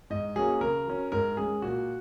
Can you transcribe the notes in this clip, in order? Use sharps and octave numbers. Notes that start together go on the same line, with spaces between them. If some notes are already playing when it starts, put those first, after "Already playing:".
G#2 D#5
F#3 A#3 C#4 G#4
C#3 A#4
F#3 C#4
G#2 A#4
G#3 C#4 G#4
A#2 F#4